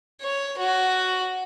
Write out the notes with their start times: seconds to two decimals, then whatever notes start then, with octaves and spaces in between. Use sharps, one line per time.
0.21 C#5
0.57 F#4